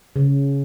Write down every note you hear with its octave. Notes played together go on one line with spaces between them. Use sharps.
C#3